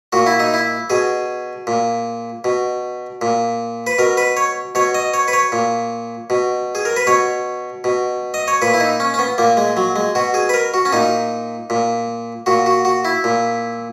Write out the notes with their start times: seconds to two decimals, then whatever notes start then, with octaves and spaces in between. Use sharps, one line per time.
0.13 A#2 F#4
0.26 E4
0.40 D#4
0.54 E4
0.90 B2 G#4
1.67 A#2
2.44 B2
3.21 A#2
3.87 B4
3.99 B2 A#4
4.17 B4
4.37 C#5
4.75 B2 C#5
4.94 D#5
5.14 C#5
5.28 B4
5.33 C#5
5.52 A#2
6.30 B2
6.75 G#4
6.85 A#4
6.96 B4
7.07 B2 C#5
7.84 B2
8.34 D#5
8.48 C#5
8.62 A#2 B4
8.74 E4
8.80 D#4
9.00 C#4
9.14 C#4
9.19 B3
9.38 A#2 A#3
9.57 G#3
9.77 F#3
9.96 G#3
10.15 B2 F#4
10.34 G#4
10.49 B4
10.54 A#4
10.74 F#4
10.85 C#4
10.93 A#2 D#4
11.70 A#2
12.46 A#2 F#4
12.66 F#4
12.85 F#4
13.05 E4
13.24 A#2